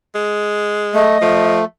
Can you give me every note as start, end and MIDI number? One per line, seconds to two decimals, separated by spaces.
0.15 1.04 56
0.94 1.18 57
0.94 1.53 75
1.21 1.61 53
1.21 1.65 57